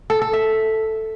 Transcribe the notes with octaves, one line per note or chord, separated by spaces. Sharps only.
A4
A4
E5